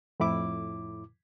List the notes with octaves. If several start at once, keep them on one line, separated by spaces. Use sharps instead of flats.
F2 A2 E4 D6